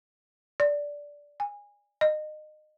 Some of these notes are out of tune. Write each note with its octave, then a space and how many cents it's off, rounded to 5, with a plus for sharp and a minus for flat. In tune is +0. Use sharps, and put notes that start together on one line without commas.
D5 -10
G#5 -20
D#5 -25